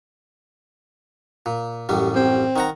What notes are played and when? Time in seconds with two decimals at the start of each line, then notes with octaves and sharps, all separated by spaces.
1.46 A#2
1.89 A1 F#2 G3
2.16 C4
2.56 D#3 F#5 A#5